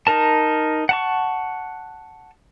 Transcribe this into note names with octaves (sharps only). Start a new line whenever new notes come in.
D#4 A#4 A5
F#5 A5 C#6